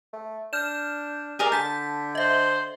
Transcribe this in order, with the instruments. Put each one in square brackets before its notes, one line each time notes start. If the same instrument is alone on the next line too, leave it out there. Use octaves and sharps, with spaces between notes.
[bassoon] A3
[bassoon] D4 [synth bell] F6 G6 E7
[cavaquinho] G#4 A#4 D5
[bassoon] D3 [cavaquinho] A5 [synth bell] G6 B6
[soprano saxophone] C5 [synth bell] D#5 E5